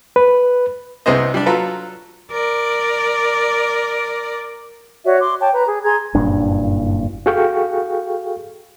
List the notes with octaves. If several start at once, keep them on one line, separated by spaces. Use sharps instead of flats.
B4
C2 C3 B3 G#4 C5 D#5
G3 D4
F#3 F4 A4 B4 A#5
A#4 D5
F#4 C#5 D5 E5
C6 D6
C#5 G5 A5
B4 A#5
G#4
G#4 A#5 C6 G#6
F#1 G2 A#2 D4
F#4 G#4 A4 F5 G5 C#6